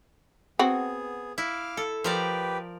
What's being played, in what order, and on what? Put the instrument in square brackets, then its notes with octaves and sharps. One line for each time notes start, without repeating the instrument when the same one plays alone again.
[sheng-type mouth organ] B3 G#4 [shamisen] C4 F#4
[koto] E4 [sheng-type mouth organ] F5 D6 F6
[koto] A4
[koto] F3 A#4 D5 [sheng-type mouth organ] G4 B4